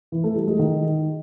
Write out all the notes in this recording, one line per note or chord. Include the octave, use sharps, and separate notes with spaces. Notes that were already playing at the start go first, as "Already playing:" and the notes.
E3
A3
G3
G#3
D#3